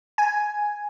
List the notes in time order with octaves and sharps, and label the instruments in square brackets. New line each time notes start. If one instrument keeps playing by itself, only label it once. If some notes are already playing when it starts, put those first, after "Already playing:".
[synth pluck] G#5